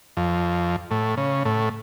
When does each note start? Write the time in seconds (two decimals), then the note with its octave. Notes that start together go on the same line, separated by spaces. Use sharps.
0.17 F2
0.91 A2
1.17 C#3
1.45 A2